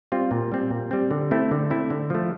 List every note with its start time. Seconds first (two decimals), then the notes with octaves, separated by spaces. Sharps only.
0.12 G3 C4 F4
0.31 A#2
0.52 G3 C4
0.70 A#2
0.91 G3 C4
1.11 D3
1.31 A3 C4 E4
1.51 D3
1.70 A3 C4 E4
1.90 D3
2.10 F3 A3